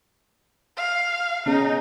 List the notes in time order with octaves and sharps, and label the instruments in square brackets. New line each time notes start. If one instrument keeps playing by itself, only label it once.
[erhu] F5
[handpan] B3 C#4 G#4 [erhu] D#4